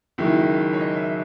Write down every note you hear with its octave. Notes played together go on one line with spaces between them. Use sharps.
F#1 F#2 D#3 G#3 E4
C#5
D#5
E5